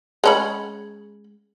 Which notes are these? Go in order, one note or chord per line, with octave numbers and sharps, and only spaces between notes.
G#3 C#4 B5